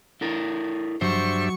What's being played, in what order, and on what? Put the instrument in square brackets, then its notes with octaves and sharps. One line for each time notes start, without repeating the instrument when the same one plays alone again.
[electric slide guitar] E4 A4 A#4
[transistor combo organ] G2 D4 E5 [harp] F#3 [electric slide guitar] C5 [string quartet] C#6